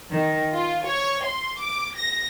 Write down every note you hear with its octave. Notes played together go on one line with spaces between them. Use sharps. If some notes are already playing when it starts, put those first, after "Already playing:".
D#3
F4
C#5
C6
D6
A#6